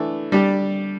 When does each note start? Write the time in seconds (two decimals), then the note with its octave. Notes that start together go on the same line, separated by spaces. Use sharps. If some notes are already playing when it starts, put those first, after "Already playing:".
Already playing: E3 A3 D4
0.32 G3 D4 G4